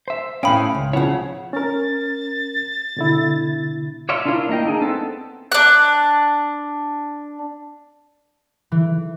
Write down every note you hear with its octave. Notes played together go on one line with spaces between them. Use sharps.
C5 E5
A2 C#4 F5 G5 B5 D#6
C#2
C#3 F3 E4 C#5 F#5
C#4 A#4 A6
B2 D3 E4
C#5 D5 E5 F5 C6
D4 E4 F4 A#4 F5
A#3 E4 D#5 G5
D4 D#4 G#4
B3 C4 A4
D4 F#6
E3